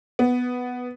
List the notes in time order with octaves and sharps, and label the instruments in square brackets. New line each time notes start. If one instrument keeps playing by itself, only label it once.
[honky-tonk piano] B3